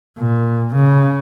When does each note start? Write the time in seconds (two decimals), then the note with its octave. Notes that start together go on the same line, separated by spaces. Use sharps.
0.18 A#2
0.74 C#3